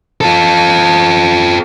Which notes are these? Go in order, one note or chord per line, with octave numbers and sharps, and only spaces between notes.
F4 A4